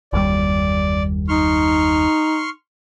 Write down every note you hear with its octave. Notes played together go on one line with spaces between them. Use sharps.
F#1 D#2 G3 D5
D#4 C6 C#6 F6